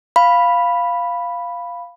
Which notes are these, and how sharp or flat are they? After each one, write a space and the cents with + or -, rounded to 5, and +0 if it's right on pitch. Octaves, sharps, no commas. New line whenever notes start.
F5 +0 B5 +0